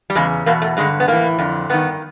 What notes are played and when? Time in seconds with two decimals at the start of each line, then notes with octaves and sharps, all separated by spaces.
0.10 G3
0.15 E2 C#3 G#3
0.46 E2 B2 A#3
0.62 A3
0.77 G2 D3 G#3
1.00 B3
1.08 A2 E3 A#3
1.38 F2 D3
1.69 G2 D#3 B3